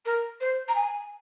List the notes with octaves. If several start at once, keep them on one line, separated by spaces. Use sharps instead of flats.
A#4
C5
A#5
G#5